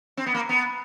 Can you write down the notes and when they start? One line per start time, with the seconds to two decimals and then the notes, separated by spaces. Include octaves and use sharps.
0.17 C4
0.26 B3
0.34 A#3
0.49 B3